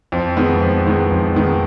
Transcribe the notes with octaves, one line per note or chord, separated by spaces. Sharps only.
F2
D#3 G#3 B3
F2
D#3 G#3 B3
F2
D#3 G#3 B3